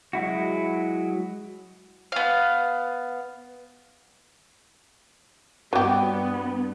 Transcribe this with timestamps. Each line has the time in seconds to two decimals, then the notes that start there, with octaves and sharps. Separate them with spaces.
0.13 F#3 G#3 E4 F#4
2.12 B3 F5
5.73 G2 F#3 B3 G4